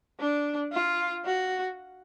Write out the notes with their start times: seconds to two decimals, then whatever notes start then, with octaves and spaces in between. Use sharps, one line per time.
0.20 D4
0.73 F4
1.25 F#4